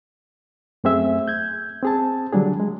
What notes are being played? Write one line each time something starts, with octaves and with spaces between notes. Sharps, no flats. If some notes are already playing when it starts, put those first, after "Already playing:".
F#2 A3 C4 G#4 E5 E6
G6 G#6
C4 G#4 A5
D3 F#3 G3 D4 G#4
G#3